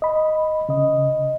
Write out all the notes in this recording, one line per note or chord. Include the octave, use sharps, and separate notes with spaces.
D#5 B5
C#3 D#5